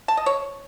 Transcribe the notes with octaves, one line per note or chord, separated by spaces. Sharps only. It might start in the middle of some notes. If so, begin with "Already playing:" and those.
A5
D#5
C#5